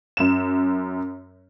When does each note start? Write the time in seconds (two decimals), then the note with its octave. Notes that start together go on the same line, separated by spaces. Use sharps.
0.17 F#2 E7